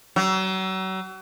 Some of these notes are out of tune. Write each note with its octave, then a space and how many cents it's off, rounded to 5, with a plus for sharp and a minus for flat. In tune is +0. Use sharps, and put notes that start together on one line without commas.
F#3 +35